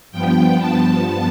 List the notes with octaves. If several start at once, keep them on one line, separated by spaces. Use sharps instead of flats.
G2 F3 B3 G5
A5